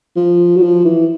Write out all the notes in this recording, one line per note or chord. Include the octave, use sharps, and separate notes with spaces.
F3
F#3
F3
E3